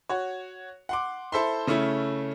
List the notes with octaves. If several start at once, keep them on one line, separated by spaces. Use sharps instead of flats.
F#4 C#5
F#5 C6 D6
E4 A4 C5 E5 B5 C6
C#3 A3 C#4 E4